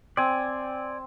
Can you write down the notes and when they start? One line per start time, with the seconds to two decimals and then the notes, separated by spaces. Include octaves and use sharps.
0.17 C4 D5 G#5